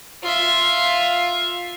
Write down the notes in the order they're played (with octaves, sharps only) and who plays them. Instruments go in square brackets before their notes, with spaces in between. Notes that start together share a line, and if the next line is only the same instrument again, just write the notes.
[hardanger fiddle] F4 E5